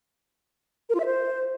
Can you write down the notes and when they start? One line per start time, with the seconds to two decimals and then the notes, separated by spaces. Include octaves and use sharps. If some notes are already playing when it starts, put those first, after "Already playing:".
0.90 A#4
0.95 F4
1.00 E5
1.05 C5